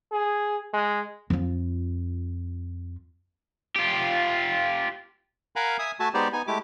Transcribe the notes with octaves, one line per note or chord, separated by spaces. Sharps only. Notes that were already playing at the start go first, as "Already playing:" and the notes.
G#4
G#3
F2 F4
F4 G4
A#4 F5 F#5 G#5 A#5 B5
E5 G#5 D#6
A3 F#4 E5 G#5 A5
G#3 B3 D#4 G4 C5 D5
B3 D#4 G#5
G#3 A3 E4 G4 D6